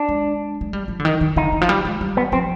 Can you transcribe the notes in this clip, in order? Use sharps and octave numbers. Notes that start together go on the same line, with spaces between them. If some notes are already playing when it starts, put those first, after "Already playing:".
Already playing: D4
G#3
G#3
G3
F3
D3
D#3
D#3
D3 D#4
D#3
F3
G3
G#3
G3
B3
F3 C4